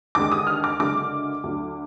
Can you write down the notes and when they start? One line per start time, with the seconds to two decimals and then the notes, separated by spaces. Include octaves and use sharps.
0.15 D#2 D3 G#3 D6
0.32 D#6
0.47 F6
0.64 D6
0.79 F#1 F#2 D3 G#3 D6
1.43 D2 D3 F#3